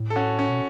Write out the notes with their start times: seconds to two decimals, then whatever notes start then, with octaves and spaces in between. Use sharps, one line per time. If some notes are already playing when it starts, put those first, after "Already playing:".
Already playing: A2
0.10 A4
0.16 C#4 F#4
0.39 C#4
0.49 B2